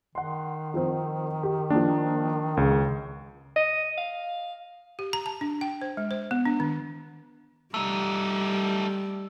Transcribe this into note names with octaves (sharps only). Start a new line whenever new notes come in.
D#3 F#5 C6
F3 C4
G4
F3 A#3 D4
C#2 C#3
D#5
F5
G4
A#5
A5
D4
G5
C5
G#3
C5
B3
D4
D#3
G3 A3 D#4 E6